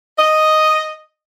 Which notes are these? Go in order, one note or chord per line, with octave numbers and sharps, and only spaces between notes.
D#5